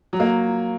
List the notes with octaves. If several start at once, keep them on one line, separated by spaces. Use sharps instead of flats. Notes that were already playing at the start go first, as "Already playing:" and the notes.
F#3
A#3